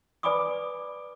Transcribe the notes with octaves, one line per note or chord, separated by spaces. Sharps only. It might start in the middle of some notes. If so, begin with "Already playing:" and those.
B4 D5 G#5 B5 D6 D#6